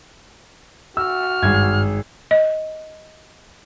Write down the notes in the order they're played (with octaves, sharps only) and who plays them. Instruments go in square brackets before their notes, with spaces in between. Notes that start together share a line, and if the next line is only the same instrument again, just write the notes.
[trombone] F#4 [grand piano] E6 [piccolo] F6
[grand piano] G#1 G#4 G#6 [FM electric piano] G2
[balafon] D#5